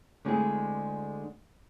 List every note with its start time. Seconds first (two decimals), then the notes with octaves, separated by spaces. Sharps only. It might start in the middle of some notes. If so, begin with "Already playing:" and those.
0.25 D2 D3 G#3 C4 E4 G#4